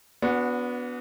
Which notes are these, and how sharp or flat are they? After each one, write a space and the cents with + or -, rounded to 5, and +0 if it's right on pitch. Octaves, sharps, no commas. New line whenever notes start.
B3 +0 D4 -30 F#4 -25